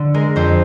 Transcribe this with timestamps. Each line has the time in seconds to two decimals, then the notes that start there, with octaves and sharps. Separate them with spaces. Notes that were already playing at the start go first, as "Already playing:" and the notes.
Already playing: D3
0.14 G#3 A#4
0.36 F2 C5